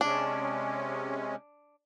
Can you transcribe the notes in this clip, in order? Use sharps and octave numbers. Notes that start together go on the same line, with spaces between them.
C3 G#3 C#4 D4